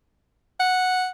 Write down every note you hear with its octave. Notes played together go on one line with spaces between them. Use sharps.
F#5